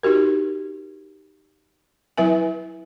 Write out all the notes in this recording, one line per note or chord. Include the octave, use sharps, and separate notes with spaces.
D#4 F#4 G4 A#4
F#3 E4 B4 E5 G#5